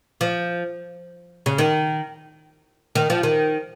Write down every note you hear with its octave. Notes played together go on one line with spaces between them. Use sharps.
F3
C#3
D#3
D#3
F3
D#3